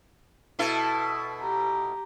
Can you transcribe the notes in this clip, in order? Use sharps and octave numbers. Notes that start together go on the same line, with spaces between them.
B2 E4 A4
G4 A#5